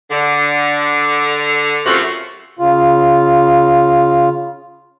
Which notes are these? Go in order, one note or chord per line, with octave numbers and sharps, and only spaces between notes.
D3
F#2 C3 A3 F4 F#4
C#3 F4